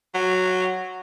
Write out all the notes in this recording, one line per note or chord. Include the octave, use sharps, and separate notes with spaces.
F#3